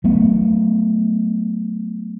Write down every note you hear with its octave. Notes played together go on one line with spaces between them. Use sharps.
F#3 A3 B3